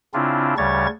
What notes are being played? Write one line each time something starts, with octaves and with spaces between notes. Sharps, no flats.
C#3 C4 D4 E4 F4
D2 C#3 G3 C#5 C#6 A6